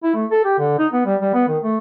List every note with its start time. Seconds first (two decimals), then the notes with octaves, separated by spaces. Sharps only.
0.04 E4
0.15 A3
0.31 A4
0.45 G4
0.59 D3
0.79 D#4
0.93 B3
1.06 G3
1.21 G3
1.34 B3
1.48 D#3
1.64 A3